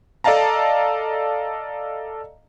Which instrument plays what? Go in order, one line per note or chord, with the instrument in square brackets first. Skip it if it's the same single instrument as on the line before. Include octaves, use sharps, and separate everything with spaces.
[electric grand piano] A4 D5 D#5 F5 A5 A#5